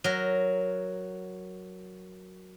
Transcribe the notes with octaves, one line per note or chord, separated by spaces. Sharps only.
F#3 A#4